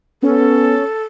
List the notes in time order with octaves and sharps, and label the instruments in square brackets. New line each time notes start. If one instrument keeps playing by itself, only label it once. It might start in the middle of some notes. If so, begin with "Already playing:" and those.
[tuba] B3 [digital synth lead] C#4 [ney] A4